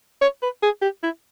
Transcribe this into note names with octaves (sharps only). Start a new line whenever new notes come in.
C#5
B4
G#4
G4
E4